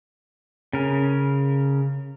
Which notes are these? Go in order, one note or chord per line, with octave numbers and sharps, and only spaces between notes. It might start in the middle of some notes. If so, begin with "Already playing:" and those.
C#3 A#4